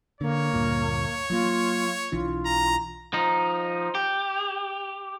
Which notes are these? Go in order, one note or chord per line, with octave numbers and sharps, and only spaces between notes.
D3 A#3 C#5
D2 G2 A#2
F#3 A3 A#3 F4
B1 E3 D4 F4
A#5
F3 D#4
G4